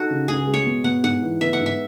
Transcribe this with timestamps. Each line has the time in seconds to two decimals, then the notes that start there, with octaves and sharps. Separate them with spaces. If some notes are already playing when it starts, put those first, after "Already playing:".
Already playing: D#4 F#4 A4
0.10 C#3
0.28 C#2 G#4
0.47 G#3
0.54 C#5
0.66 B2
0.84 B2 F#5
1.03 G#2 F#5
1.22 E3
1.41 B3 E5
1.53 F#5
1.60 G#2
1.66 E5